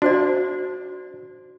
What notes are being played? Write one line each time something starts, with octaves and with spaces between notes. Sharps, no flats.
D4 F#4 C5 D5